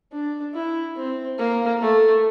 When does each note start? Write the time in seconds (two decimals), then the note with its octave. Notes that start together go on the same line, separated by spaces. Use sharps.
0.12 D4
0.54 E4
0.96 C4
1.38 A#3
1.81 A3